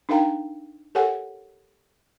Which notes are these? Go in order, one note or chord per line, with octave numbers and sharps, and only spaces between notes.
D4 D#4 A#4 F5 G5 A#5
G4 A4 A#4 C#5 F#5 G#5